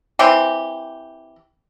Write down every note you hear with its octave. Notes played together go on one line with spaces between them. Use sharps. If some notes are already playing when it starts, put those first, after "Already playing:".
E3 C4 G4